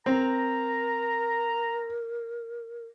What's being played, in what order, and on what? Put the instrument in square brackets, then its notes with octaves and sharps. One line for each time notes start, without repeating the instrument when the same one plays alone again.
[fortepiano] C4 [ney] A#4 [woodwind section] A#5